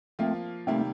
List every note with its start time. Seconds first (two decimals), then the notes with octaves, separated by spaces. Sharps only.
0.19 F3 A3 A#3 C4 F4
0.67 C3 D#3 G3 A3 A#3 C4